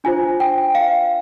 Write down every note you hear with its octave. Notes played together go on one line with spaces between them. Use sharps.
D4 F4 C5 G#5
G5
F5